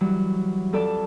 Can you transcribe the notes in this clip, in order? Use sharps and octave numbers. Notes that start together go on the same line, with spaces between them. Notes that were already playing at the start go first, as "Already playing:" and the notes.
E3 F#3 G3
F2 A4 D5 A5